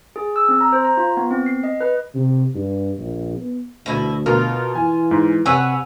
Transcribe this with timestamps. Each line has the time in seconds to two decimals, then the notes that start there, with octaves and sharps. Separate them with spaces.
0.16 G#4
0.36 E6
0.49 C4
0.61 A#5
0.73 C5
0.85 A#5
0.97 F4
1.17 B3
1.31 C4
1.46 C7
1.64 D#5
1.81 B4
2.15 C3
2.55 G2
2.97 A#1
3.37 B3
3.86 D2 B2 E4
4.26 B2 F4 A#4 F6
4.75 E3 G#5
5.11 G#2
5.46 C3 B4 C#5 F#5 G#5 E6